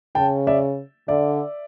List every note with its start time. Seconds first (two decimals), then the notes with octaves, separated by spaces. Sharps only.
0.15 C#3 G5 A5
0.47 D5 E5
1.08 D3 D5 E5